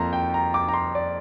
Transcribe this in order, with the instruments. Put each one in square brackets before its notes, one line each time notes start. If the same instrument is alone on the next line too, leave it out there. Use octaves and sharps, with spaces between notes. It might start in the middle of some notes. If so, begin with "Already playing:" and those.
Already playing: [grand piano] F2 F3 A#3 A#5 C6
G5
A#5
D6
A#5
C6
D5